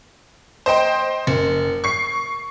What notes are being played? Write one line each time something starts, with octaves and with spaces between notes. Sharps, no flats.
C5 D#5 G5 C6
F#1
C#6 C7